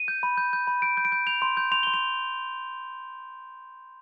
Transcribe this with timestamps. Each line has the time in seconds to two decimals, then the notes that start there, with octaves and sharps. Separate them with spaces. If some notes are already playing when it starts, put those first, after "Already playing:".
Already playing: D#7
0.08 G6
0.23 B5
0.37 G6
0.53 G6
0.67 B5
0.82 G6 D7
0.97 G6
1.05 D7
1.12 G6
1.27 G6 F7
1.42 C6
1.57 G6
1.71 C6 F7
1.83 C6 G7
1.94 F7